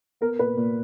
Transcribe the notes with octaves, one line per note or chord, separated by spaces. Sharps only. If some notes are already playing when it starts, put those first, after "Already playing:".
B3 A#4
A#2 B4
A#2